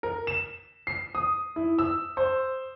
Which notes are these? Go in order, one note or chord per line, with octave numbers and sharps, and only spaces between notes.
A#4
E7
C7
D#6
E4
E6
C5